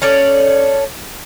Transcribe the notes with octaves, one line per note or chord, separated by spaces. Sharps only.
C#4 A4 C#5 D5